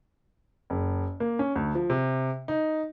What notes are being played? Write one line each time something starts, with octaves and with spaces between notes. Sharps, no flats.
F#1
A#3
C#4
D2
F3
C3
D#4